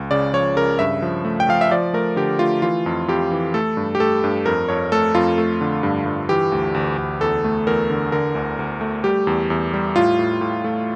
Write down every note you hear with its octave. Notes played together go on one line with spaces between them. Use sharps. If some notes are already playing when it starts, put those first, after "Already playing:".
Already playing: C#2
C#3 D5
F3 C#5
C#3 A#4
G2 E5
F3
A3
G5
F3 F5
E5
F3 D5
A3 A#4
D3 G4
A3 F4
E3 F4
F2
F2 G4
E3
A3 A4
G2
G4
A3 A4
G2
F2 A#4
F2 C#5
A3 A4
F2 F4
A3
D3
G2
G2
E3 G4
D2
D2
D2
E2 A4
A3
E2 A#4
D3
D3 A#4
D2
D2
A3
G3 G4
E2
E2
G3
A2 F4
A2
A2
A3